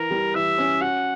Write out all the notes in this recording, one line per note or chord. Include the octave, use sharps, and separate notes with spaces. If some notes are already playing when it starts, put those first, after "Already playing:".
Already playing: E3 A#4
G3
E3 E5
C#4
F#4 F#5